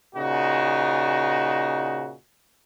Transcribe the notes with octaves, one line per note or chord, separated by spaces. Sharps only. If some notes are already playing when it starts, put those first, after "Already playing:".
A#2 C#3 D#4 F#4